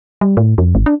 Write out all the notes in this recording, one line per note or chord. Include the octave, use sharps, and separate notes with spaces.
G3
A2
F2
G#1
D4